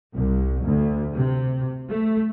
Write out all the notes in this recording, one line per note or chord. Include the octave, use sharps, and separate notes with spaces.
C2
D2
C3
A3